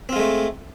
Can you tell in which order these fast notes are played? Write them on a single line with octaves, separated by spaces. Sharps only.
C4 F4 G#3 A3